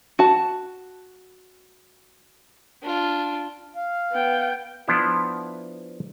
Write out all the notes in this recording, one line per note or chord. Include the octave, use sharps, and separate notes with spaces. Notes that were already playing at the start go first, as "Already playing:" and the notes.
F#4 A5
D4 F4
F5
B3 G5
F3 B3 D4 E4